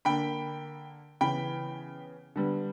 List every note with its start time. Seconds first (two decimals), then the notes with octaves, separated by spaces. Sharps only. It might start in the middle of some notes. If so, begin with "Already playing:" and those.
0.05 D3 A#3 G5 B5
1.21 C#3 E3 B3 G5 B5
2.36 D3 G3 B3